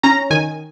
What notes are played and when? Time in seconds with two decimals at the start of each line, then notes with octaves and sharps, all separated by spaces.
0.03 C#4 A#5
0.30 D#3 G#5